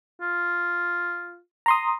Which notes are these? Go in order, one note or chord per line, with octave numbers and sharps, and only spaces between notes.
F4
A#5 C6 D#6